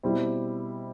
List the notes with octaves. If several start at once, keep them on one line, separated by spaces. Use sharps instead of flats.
B2 G3 C4 E4